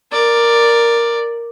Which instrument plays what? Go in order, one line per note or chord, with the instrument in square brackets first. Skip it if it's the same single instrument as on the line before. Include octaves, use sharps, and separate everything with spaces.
[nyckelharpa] A#4 D5